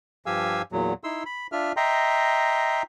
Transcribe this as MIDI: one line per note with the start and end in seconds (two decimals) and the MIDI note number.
0.26 0.62 43
0.26 0.62 53
0.26 0.62 67
0.26 0.62 77
0.26 0.62 80
0.26 0.62 88
0.72 0.93 40
0.72 0.93 46
0.72 0.93 54
1.04 1.23 63
1.04 1.23 64
1.04 1.23 84
1.04 1.23 88
1.26 1.47 83
1.52 1.72 62
1.52 1.72 65
1.52 1.72 76
1.52 1.72 89
1.77 2.83 75
1.77 2.83 76
1.77 2.83 79
1.77 2.83 82
1.77 2.83 84